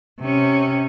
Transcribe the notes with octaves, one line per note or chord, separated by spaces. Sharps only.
C3 C#4